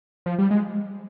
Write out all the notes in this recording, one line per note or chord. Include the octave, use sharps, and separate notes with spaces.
F3
G3
G#3